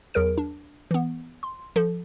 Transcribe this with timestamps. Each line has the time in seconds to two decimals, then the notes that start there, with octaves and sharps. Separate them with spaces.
0.14 E2 F#3 G#4 A#4 F6 D7
0.38 D4
0.91 E3 B3
1.43 C6
1.76 F3 A4